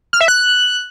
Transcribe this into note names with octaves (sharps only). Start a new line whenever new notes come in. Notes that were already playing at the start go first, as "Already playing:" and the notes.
F6
E5
F#6